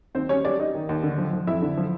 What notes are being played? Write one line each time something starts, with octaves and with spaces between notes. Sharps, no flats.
D#2 C4 C5
G3 C#4 C#5
G3 D4 D5
G3 D#4 D#5
D#3
D#2
D3
F3
F3
F2 E4 E5
D3
F3